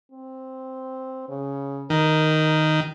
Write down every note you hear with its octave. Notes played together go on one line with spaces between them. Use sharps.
C4
C#3
D#3 A#4